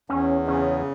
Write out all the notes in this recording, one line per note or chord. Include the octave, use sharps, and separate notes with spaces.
E2 C#4
C#3 C#4